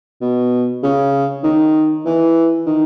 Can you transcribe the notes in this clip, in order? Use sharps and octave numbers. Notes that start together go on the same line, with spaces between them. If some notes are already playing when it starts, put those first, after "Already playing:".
B2
C#3
D#3
E3
D#3